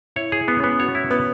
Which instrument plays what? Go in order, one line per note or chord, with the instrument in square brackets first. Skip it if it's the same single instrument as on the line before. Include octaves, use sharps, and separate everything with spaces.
[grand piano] E4 [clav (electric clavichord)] C#5
[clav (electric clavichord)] G#4
B3
[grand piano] C#4
[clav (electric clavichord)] B3
[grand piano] F#4 [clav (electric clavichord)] C#5
[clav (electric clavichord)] E4
[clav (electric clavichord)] B3 [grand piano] B4